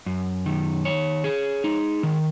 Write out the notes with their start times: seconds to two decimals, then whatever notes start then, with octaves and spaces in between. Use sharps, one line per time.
0.06 F#2
0.46 D#3
0.85 C#5
1.24 G#4
1.64 D#4
2.03 D#3